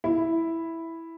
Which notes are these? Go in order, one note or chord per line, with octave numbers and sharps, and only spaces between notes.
E4